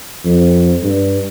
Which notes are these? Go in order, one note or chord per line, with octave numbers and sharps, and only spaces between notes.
F2
G2